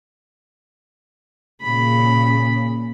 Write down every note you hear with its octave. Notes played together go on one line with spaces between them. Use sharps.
A#2 C#3 B5